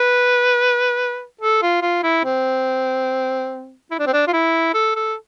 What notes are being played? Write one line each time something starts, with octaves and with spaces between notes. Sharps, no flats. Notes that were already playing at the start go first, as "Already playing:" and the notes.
Already playing: B4
A4
F4
F4
E4
C4
E4
D4
C4
D4
F4
E4
A4
A4